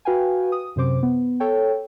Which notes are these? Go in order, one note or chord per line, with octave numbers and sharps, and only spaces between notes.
F#4 B4 F5 G5 G#5
D#6
F#2 C3 C5 D6
B3
A4 C#5 G5